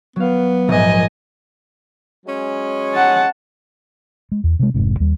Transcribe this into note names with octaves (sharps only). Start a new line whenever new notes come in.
F#3 B3 F5
A#1 G#2 F3 D#5 G#5
F#3 G#3 C#4
F#5 A5
G#3
E2
C3 G#3
F1 G#2 C3
D#2 G3